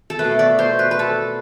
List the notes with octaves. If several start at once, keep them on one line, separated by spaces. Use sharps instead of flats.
A4
B2 A3 B4
D5
C5
B4
B4
A4